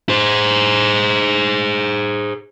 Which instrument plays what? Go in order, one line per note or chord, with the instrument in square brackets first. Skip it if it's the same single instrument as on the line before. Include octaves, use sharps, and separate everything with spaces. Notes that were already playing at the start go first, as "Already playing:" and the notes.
[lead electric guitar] G#4 C5